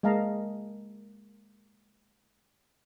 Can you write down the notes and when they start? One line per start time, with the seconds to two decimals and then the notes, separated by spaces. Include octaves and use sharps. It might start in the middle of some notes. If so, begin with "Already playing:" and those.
0.03 G#3 A#3 D#5 F5 A5 A#5